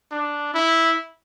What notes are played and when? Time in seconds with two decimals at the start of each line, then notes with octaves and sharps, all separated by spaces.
0.11 D4
0.54 E4